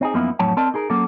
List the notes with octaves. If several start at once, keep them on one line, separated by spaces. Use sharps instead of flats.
C4 D#4 G#4
F#2 F3 A#3 B3 D#4 E4
F2 A2 F#3 C#5 A5
C4 A#4 D5 D#5 A5
D#4 G#4 A#4
F#3 A#3 C#4 A4